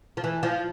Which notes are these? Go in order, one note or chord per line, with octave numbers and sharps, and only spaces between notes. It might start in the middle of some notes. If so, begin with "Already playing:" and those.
F3
E3
F3